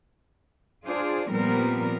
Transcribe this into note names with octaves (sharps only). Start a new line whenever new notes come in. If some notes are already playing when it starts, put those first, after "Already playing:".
D4 F4 G#4 C5 D5
A#2 F3 G3 B3 C4 A#4